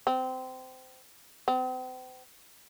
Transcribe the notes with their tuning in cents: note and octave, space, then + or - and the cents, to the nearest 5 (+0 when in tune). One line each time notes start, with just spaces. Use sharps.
C4 -20
C4 -40